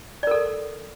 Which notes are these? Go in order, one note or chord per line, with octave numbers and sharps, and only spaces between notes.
A4 A#4 D5